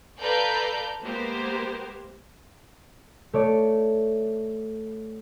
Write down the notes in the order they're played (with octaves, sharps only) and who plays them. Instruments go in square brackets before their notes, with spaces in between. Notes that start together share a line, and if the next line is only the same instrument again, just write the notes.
[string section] A4 B4 D5 F5 A#5 G6
G#3 A#3 B3 G4 A#4 C5
[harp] A3 C#5 D5